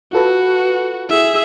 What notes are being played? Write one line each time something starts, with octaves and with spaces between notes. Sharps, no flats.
F4 F#4 A4 B4
E4 G#4 E5